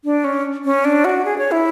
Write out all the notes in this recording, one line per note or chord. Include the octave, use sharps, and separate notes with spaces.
D4
C#4
C#4
D4
F#4
G#4
C#5
E4